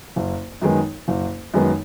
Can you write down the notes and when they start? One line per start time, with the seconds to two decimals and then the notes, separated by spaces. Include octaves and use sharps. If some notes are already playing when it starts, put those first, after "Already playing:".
0.16 F#1
0.62 F#2 D#3 G#3 B3
1.08 F#1
1.54 F#2 D#3 G#3 B3